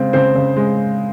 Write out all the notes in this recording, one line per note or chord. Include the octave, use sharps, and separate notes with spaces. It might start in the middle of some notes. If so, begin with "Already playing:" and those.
Already playing: C#3 G#3 C4
C#3 C4 C5
C#3
G#3